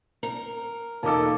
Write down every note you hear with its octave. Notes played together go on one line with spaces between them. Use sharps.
A#4
E1 A#3 D#4 A4 A5 D6